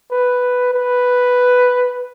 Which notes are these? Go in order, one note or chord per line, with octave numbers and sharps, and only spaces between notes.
B4
B4